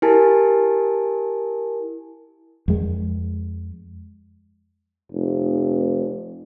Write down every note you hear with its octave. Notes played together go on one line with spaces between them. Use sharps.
E4 G4 A#4 G#5 A5
F2 G#3
F1